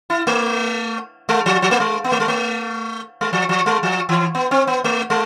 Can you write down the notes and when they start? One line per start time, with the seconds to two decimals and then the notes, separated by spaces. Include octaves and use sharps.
0.10 E4
0.27 A3
1.29 G#3
1.46 F3
1.62 F3
1.71 A3
1.80 G#3
2.04 B3
2.12 A3
2.20 G#3
2.28 A3
3.21 G#3
3.33 F3
3.49 F3
3.66 G#3
3.83 F3
4.09 E3
4.35 B3
4.51 C4
4.67 B3
4.84 A3
5.10 G#3